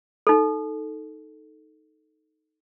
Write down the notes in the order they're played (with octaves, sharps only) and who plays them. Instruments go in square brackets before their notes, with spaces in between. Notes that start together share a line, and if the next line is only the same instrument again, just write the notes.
[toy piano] D#4 A4